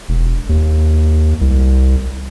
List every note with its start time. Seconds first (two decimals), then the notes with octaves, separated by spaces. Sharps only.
0.09 E1
0.49 D#2
1.41 C2